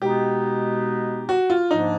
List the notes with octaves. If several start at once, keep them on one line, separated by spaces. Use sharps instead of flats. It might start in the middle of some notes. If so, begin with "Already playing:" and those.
B2 G#3 B3 D#4 G4
F#4
F4
G#2 F3 A#3 D4 D#4